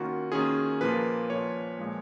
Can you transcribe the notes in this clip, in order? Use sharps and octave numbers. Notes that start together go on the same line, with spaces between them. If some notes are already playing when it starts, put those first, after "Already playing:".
Already playing: D#3 A#3 C#4 F4 F#4
D#3 A#3 C#4 F4 G#4
A#2 F3 A#3 F4 B4
A#2 F3 A#3 F4 C#5
A#2 F3 G#3